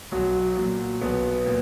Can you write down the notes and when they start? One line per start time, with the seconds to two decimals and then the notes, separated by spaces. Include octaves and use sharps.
0.12 B1 F#3
0.57 A#2 F#3
1.01 B1 B3
1.46 A#2